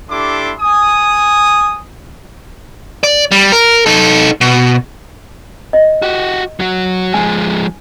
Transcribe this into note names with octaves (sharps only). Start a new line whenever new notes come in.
D4 E4 G4 A4 C6 D6
G#5 D#6
D5
G3
A#4
D#4 A4
B2
D#5
F#4 G4
F#3 F#4
F3 G#3 G#5